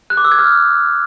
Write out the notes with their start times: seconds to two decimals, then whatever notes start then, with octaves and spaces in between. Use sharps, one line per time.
0.10 F#6
0.17 D6
0.24 E6
0.32 G#6
0.39 F6